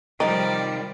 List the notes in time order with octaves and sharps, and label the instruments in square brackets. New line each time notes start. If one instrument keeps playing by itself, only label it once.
[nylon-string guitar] C3 D#3 [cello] F3 G3 [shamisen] D#4 [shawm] D5